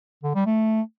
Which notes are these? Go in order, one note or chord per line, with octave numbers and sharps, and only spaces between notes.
D3
G3
A3